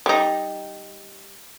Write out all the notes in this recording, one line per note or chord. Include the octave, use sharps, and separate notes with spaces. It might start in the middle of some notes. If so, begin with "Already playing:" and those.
G3 D#4